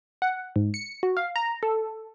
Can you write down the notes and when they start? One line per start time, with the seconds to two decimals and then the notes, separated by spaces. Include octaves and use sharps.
0.22 F#5
0.56 G#2
0.74 C#7
1.03 F#4
1.17 F5
1.36 A#5
1.63 A4